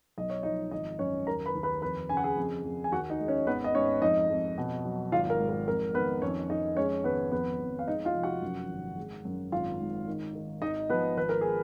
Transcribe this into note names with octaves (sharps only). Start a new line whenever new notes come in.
B1 D#5
C#5
F3 D#4 D#5
G#1 D#4 D#5
F#2 C#4 C#5
D#2 A#4 A#5
B4 B5
D#2
B4 B5
F2 B4 B5
C#3 G#5
F#5
G#4 G#5
F2
F2
G#5
D#2 F#4 F#5
D#4 D#5
G#3
C#4 C#5
G#1 B3 B4
D#5
G#2 C#4 C#5
F2 D#4 D#5
F2
B2
F#3
G#1 F4 F5
A#4
G#2
A#4
F2 A#4
D#3 B3 B4
F2 C#4 C#5
F2 D#4 D#5
G#3 C#4 C#5
G#1 B3 B4
F2 B3 B4
F2
F5
G#3 D#4 D#5
F4 F5
F1
F#4 F#5
F#2
G#1
G#3
F#2
G#1 F4 F5
G#2
D#3
D#3
G#1 D#4 D#5
F3 B3 B4
G#1 B4
A#4
G#4